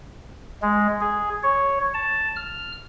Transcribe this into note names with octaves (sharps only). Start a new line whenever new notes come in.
G#3
G#4
C#5
A5
F6